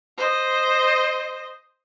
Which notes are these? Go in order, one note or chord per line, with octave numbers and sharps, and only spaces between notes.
C5 D#5